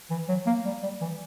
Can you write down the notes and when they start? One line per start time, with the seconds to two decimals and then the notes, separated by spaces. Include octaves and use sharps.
0.10 E3
0.29 F#3
0.46 A#3
0.66 G3
0.83 G3
1.01 E3